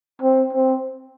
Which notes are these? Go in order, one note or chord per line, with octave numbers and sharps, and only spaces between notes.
C4
C4